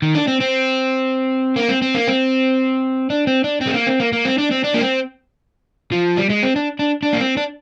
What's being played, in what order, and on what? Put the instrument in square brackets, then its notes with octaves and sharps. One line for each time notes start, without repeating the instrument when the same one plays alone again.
[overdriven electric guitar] D#3
D4
C4
C4
A#3
C4
C4
A#3
C4
D4
C4
D4
C4
G#3
A#3
C4
A#3
A#3
C4
D4
C4
D4
A#3
C4
F3
G3
G#3
C4
D4
D4
D4
A#3
C4
D4